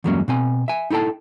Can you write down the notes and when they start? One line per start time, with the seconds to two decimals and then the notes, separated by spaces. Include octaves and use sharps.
0.04 E2 G2 F#3 G#3 A#3 C#4
0.28 B2 C4 G#5
0.68 E5 G#5
0.90 D#4 E4 A4 G5 A5